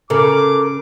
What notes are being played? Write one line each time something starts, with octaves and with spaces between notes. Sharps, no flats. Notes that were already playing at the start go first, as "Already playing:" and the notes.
C#3 A4 A#4 D6